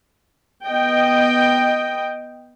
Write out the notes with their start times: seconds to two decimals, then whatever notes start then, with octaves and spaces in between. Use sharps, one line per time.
0.67 B3 D#5 G5